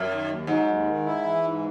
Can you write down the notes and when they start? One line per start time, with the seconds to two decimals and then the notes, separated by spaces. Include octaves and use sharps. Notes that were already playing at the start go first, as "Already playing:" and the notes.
Already playing: F#2
0.10 D#3
0.29 D#2
0.47 G#2 F#3
0.67 D#2
0.86 D#3
1.05 E4
1.24 E3
1.44 G#2